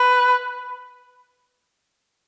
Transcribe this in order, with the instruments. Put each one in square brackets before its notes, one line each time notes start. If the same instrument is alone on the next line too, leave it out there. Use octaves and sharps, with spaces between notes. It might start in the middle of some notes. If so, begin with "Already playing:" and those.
Already playing: [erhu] B4